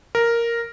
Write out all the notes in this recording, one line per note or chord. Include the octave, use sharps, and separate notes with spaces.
A#4